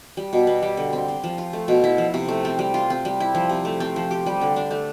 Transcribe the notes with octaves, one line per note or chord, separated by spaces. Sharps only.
G3
B2
B3
G3
D3
C4
C4
F3
F4
A3
B2
E4
F3
C3
A3
C4
G3
F4
C4
G3
E4
F3
C3
A3
C4
F3
G4
G3
D3
D4
A3